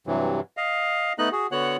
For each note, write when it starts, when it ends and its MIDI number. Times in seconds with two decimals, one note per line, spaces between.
0.07 0.40 43
0.07 0.40 48
0.07 0.40 52
0.07 0.40 54
0.57 1.13 75
0.57 1.13 77
1.19 1.29 57
1.19 1.29 59
1.19 1.29 63
1.19 1.29 75
1.19 1.29 90
1.32 1.47 66
1.32 1.47 68
1.52 1.77 50
1.52 1.77 59
1.52 1.77 66
1.52 1.77 73
1.52 1.77 78
1.52 1.77 90